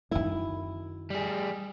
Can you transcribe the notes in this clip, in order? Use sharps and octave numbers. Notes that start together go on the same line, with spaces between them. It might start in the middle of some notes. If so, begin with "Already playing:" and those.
F#2 D#3 E4
G3 G#4